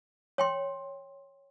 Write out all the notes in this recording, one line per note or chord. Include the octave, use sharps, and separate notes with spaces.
C#5 G5 C6